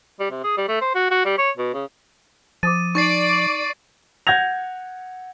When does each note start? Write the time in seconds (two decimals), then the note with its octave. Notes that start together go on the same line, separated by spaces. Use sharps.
0.20 G3
0.31 C3
0.44 G#4
0.57 G3
0.69 A3
0.81 C5
0.95 F#4
1.11 F#4
1.26 G3
1.38 C#5
1.58 B2
1.74 C#3
2.63 F3 D6 D#6 A6 D#7
2.95 D#4 D5 C#6 A6 C7
4.27 F#5 G6 G#6 A#6 F7